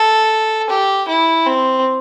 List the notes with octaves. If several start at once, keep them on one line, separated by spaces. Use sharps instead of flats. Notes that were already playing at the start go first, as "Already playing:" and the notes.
Already playing: A4
G4
E4
C4